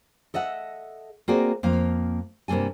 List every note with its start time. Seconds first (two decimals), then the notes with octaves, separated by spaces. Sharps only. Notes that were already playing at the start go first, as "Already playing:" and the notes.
0.34 A4 D#5 E5 F#5
1.28 A#3 C4 F#4 G#4 D5
1.63 F2 A#3 F5
2.48 G2 C3 A#3 A4 G#5